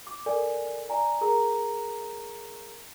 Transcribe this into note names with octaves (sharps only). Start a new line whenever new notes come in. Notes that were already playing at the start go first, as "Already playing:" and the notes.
D6
A4 A#4 D5 G#5
D5 G#5 A#5
G#4 A#4 A#5